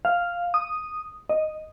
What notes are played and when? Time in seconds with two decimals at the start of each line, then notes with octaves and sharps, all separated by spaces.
0.05 F5
0.54 D#6
1.29 D#5